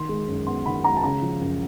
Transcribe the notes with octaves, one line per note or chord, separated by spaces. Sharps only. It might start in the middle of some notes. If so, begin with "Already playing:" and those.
Already playing: D#3 C6
G#3
F#2
B3 C6
D#3 B5
G#3 A#5
A5
C#3 A#5
F3
F#2